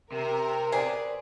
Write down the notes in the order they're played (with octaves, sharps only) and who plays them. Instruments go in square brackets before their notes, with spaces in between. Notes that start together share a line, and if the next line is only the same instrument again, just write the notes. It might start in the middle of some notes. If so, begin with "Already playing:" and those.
[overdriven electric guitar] C3 [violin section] A#4
[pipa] G#4 [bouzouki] B4 C5 D5